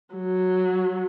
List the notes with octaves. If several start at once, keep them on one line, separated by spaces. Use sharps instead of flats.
F#3